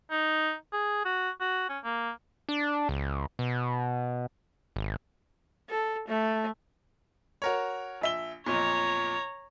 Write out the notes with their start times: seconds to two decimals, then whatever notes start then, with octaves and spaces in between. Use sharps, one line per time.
0.11 D#4
0.73 G#4
1.05 F#4
1.41 F#4
1.69 C#4
1.84 A#3
2.49 D4
2.89 C#2
3.39 B2
4.76 G#1
5.69 A4
6.08 A3
7.42 F#4 A#4 C#5
8.01 A#1 E5 G7
8.46 B1 F2 A#2 C#5 A#5